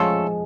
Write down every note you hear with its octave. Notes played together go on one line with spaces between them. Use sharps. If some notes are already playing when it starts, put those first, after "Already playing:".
Already playing: F3 G#3 A3 C#4 F4 A4